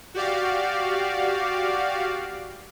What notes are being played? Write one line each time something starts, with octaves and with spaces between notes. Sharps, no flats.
F#4 G4 D5 F5